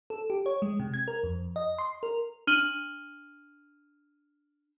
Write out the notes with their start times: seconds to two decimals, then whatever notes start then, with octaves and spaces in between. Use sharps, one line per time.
0.10 A4
0.30 G4
0.46 C#5
0.62 G#3
0.79 C3
0.94 G#6
1.08 A#4
1.23 F2
1.56 D#5
1.78 C6
2.03 A#4
2.47 D4 F6 D#7 F#7 G7